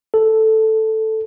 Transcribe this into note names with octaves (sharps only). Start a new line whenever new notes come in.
A4